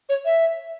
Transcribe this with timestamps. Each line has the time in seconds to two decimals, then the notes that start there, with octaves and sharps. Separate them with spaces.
0.09 C#5
0.25 E5